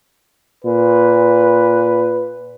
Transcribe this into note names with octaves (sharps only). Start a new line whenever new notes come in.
A#2 B4